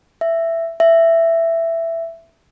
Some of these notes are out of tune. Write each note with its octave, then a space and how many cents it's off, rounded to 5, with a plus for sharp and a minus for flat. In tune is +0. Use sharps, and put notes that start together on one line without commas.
E5 +10
E5 +10